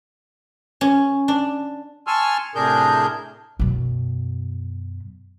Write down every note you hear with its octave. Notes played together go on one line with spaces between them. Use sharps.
C#4
D4
G#5 A5 C6 C#6 E6 F6
A2 C3 D4 G#4 A#4 G6
F#2 B2